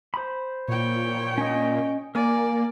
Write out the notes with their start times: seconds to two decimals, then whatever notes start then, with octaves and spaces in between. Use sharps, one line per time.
0.14 C5 B5
0.68 A#2 C#5 G5
1.38 C#4 D#5
2.15 A#3 A#4 D5 G#5